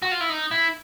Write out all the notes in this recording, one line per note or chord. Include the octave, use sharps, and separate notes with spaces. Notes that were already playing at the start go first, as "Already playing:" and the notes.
F#4
F4
E4
D#4
E4